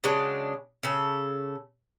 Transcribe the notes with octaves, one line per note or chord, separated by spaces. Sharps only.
C#3 F#3 G#3 D4
C#3 A4